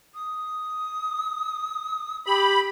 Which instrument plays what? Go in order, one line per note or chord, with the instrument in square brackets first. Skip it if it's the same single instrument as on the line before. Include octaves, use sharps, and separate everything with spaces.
[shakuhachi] D#6
[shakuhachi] G4 [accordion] B5